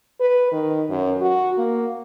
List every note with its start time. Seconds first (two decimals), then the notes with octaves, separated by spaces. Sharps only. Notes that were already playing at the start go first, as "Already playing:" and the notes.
0.20 B4
0.52 D#3
0.90 F#2
1.21 F#4
1.58 A#3